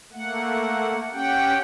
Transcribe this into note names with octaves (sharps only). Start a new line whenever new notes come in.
A3 A#3 F#5
C#4 G4 F#5 G5